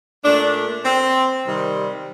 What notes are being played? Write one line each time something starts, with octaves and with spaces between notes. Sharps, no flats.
A#2 A3 D4
C4
C3 D#3 G3